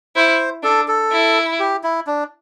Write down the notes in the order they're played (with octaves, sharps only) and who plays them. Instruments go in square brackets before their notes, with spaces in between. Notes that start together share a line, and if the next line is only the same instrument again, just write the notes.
[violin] E4 [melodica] C5
[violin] D4 [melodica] A4
[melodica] A4
[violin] E4
[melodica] G4
E4
D4